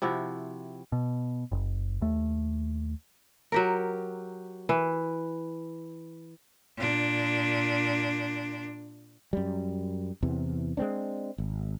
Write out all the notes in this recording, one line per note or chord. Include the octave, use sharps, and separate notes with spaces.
C3 F3 E4 F#4
B2
F#1
D#2 A3
F#3 G4 A#4
E3
A#2 D4
F#2 G3
E2 C3 E3
G#3 A#3 C4 D4
G#1